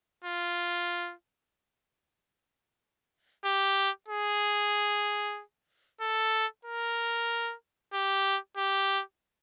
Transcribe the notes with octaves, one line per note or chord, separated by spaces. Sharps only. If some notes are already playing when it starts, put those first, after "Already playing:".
F4
G4
G#4
A4
A#4
G4
G4